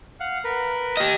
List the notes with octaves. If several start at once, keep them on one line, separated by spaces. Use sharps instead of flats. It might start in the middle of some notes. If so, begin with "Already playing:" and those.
F5 F#5
A#4 B4
G4 D#5